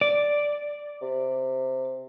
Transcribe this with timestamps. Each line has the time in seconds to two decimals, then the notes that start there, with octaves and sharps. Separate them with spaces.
0.01 D5
1.02 C3